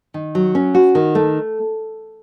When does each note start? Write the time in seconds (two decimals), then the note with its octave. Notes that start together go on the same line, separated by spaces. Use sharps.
0.14 D#3
0.35 F#3
0.55 C#4
0.75 F#4
0.95 D#3
1.15 A3